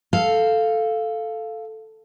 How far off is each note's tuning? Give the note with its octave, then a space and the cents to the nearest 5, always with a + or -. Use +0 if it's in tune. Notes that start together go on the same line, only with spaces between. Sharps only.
A4 +0 F5 -5